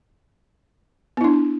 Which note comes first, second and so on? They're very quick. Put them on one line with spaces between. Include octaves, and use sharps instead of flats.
B3 E4 D4